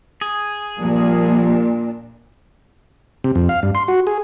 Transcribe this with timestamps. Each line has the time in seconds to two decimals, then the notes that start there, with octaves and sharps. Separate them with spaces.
0.21 G#4
0.79 A#2 F3 G3 A#3 D4
3.24 C3
3.35 F2
3.49 F5
3.63 G2
3.75 C6
3.88 F#4
4.07 G#4